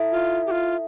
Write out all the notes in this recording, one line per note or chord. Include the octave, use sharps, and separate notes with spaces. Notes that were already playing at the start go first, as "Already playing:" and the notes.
Already playing: E4 A4 E5
F4
G4
F4